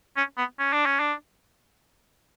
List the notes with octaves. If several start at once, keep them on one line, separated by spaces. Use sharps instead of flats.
C#4
B3
C#4
D4
C#4
D4